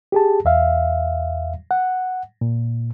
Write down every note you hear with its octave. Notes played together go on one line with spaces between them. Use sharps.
G4 G#4 A5
E2 E5 F5
F#5
A#2